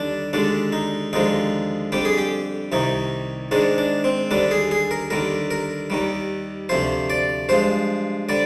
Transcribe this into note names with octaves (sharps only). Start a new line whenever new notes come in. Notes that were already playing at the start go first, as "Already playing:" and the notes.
Already playing: D#2 D3 G3 D4
D#2 D3 G#3 D4
D#4
D#2 D3 F3 G#3 D#4
F2 D3 G3 G4
G#4
G4
C2 C3 D#3 D#4
G#2 D#3 G#3 D4
D4
C4
D#2 D3 G3 D4
G#4
G#4
A#4
D#2 D3 G3 A#4
A#4
D#2 D#3 G3
D2 C3 F3 C5
D5
G2 F3 G#3 C5
D3 G3 D5